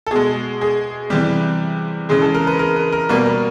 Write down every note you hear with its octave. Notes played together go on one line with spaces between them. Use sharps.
A4
B2 G#3 G#4
G#4
C3 E3 G3 G4
C#3 E3 G#3 G#4
A4
A#4
B4
A#4
B4
A#4
B2 G3 A#3 B4
A#4